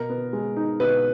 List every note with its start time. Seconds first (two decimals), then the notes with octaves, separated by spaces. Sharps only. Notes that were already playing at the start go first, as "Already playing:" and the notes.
Already playing: B2 A#4
0.09 B3
0.33 G#3
0.57 D#4
0.80 B2 B4